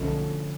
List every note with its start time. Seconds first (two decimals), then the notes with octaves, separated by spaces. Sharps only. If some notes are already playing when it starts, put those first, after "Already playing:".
Already playing: B1 B2 D3 F3 A3 C#4